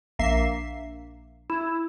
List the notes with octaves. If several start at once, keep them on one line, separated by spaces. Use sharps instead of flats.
A#1 A#3 E5 C7
E4